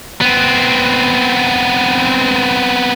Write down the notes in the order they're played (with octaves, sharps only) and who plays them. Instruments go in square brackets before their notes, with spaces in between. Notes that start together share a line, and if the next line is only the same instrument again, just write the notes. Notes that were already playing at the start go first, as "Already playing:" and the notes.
[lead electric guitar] B3 C4